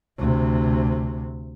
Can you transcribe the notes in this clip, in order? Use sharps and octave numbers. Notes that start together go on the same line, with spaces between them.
D2 C3